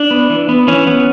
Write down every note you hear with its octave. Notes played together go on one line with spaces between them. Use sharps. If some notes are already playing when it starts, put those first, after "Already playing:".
Already playing: D4
B3
E3
B3
E3 C#4
B3